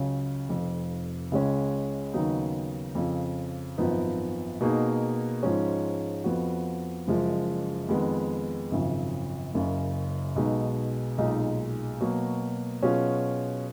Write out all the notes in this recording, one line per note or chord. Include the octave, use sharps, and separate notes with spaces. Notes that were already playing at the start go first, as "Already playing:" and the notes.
Already playing: C#2 C#3 F#3 C#4
F1 F2 F3
C#2 C#3 G#3 C#4
D#2 C#3 F#3 B3 D#4
F2 C#3 F3
G#1 F#2 F3 B3 D#4
B2 A#3 D#4 G#4
G#2 F3 G#3 C#4
F2 F3 B3 F#4
F#1 F#2 F3 G#3
F2 D#3 G#3 B3
G#1 F#2 C#3 F3
F#1 F#2 C#3
B1 B2 G#3 D#4
B1 A#2 G#3 D#4
B2 F#3 A#3
B2 F#3 C#4 F4 G#4